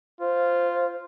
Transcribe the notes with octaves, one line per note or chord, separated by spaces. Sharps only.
F4 C5